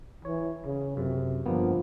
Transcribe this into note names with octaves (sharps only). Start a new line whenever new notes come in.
E3 C#5
C#3
F#2 C3
G1 F3 A#3 B3